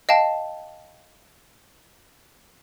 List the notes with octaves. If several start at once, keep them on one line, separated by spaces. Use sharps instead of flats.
D#5 F5 G5 A5